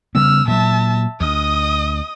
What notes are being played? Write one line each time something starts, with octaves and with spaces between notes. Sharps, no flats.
C#3 G3 B3 E6 F6
A#2 F#3 E5 A5
D2 D#5 D#6